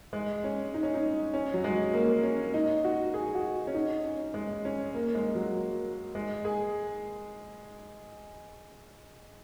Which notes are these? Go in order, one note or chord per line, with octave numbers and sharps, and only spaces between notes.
G#3
C#4
D#4
C#4
D#4
C#4
F#3
G#3
A#3
C#4
D#4
F#4
G#4
F#4
C#4
D#4
C#4
G#3
C#4
A#3
G#3
F#3
G#3
G#4